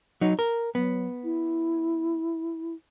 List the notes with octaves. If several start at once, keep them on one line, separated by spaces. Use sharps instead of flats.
F#3 D#4
A#4
F#3 B3
E4